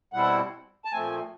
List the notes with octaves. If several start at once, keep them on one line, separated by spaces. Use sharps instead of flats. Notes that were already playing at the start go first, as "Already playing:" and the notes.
B2 G3 C4 E4 F#5
A5
A#2 F3 A3 C4 G#5